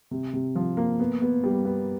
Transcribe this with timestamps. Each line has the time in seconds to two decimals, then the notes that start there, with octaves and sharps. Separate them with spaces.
0.11 C3
0.33 C3
0.55 F3
0.77 A#3
1.00 B3
1.22 B3
1.44 G3
1.65 B3